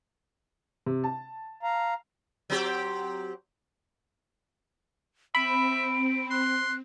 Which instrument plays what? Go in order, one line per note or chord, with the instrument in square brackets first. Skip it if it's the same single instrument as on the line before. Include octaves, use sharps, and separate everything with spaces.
[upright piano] C3
A5
[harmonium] F5 A#5
[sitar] F#3 C4 G4
[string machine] C4 [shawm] E5 [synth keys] B5 [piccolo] D7
[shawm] C6 [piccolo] F#6